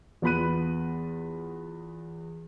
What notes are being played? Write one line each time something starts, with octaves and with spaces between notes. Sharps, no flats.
E2 B3 F4 B5 F#6 D#7